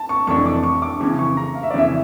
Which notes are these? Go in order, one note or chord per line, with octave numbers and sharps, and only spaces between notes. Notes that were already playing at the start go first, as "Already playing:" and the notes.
Already playing: A5
C#6
F1 F2 E3 A3 D4 C#6
D6
C#6
D6
F2 C#3 E3 C#6
C#6
A#5
F5
E5
D5
F2 C#3 E3 E5